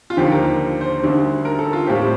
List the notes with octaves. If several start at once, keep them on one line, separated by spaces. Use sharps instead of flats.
F4
D#2 D3 F3 G4
A#4
C5
D2 D3 G3
A#4
A4
F4
A2 G3 C4 G4